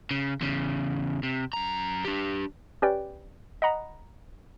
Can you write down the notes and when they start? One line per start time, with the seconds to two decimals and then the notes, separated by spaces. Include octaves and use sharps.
0.11 C#3
0.41 E2 C#3
1.23 C3
1.53 F#2 A#5
2.05 D4 G4
2.82 C#4 G4 B4 D5 G5
3.62 D#5 F#5 A#5 B5